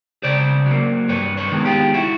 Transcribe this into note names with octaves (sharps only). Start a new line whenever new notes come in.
C#3 C5 D5
F#3 A#3
G2 B4 C#5
B4 C#5
D#3 G#3 B3
F4 G4
E4 F#4